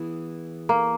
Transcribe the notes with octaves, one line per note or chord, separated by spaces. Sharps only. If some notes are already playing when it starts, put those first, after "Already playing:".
Already playing: E3 B3 E4 G#4
A#3